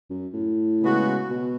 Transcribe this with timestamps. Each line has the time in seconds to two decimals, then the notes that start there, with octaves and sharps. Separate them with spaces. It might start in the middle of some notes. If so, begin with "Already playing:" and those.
0.10 F#2
0.33 A2
0.82 C#3 G#3 B3 F#4
1.31 B2